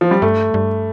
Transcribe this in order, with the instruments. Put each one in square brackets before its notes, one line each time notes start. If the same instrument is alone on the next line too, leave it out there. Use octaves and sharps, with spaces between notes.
[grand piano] F3
G3
[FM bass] G2 [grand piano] A3
[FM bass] G2